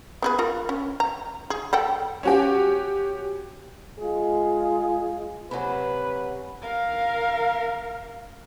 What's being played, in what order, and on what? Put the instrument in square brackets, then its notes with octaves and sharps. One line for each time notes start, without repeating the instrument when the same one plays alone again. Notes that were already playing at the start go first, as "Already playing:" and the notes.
[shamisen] B3 G#4 B4
F4 A#4
C#4
A#5
G#4
A4 F#5 G5
[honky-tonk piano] C#4 F#4 G4
[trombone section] G#3 F4 G#4
[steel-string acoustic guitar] C3 F#3 F#4 [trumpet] B4 [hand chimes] F#5 G#5 B5
[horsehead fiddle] A#4 F5